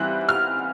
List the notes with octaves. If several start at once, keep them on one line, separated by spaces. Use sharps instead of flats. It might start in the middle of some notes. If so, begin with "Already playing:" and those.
Already playing: E3 G3 C4 E4 F#6
F6